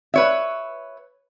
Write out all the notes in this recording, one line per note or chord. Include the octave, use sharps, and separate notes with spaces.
B4 C#5 E5